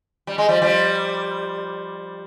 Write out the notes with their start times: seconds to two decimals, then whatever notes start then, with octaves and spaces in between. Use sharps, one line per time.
0.27 G3
0.38 G#3
0.48 F3 G3
0.62 F3 G3